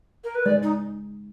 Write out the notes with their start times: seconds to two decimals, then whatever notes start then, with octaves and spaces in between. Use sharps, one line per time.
0.24 A#4
0.35 B4
0.46 G#3 D5
0.63 D#4